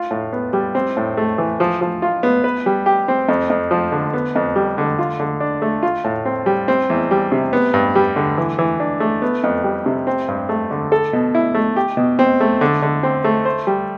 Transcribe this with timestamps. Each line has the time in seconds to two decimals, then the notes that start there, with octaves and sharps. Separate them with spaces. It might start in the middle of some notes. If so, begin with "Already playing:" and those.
Already playing: F4
0.11 A2
0.33 B3
0.53 G3
0.75 C4
0.97 A2
1.17 A3
1.38 E3
1.60 F3
1.81 F3
2.02 F4
2.23 B3
2.44 B4
2.66 G3
2.86 G4
3.08 C4
3.28 F2
3.50 F2
3.71 F3
3.92 D3
4.13 B3
4.36 F2
4.56 G3
4.78 D3
4.99 F4
5.20 D3
5.40 D4
5.62 A3
5.83 F4
6.04 A2
6.25 C4
6.46 G3
6.68 C4
6.90 E2
7.11 G3
7.32 C3
7.53 B3
7.74 G2
7.95 G3
8.16 D3
8.38 E3
8.59 E3
8.80 D4
9.00 A3
9.22 B3
9.44 F2
9.64 G3
9.86 C3
10.07 C4
10.28 G2
10.49 A3
10.71 D3
10.92 A4
11.13 B2
11.35 E4
11.55 A3
11.76 G4
11.97 B2
12.19 C4
12.40 A3
12.61 D3
12.82 D3
13.03 C4
13.24 A3
13.45 C5
13.67 G3